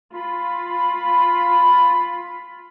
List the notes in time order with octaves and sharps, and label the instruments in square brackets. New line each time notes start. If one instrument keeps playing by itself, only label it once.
[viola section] F4 B5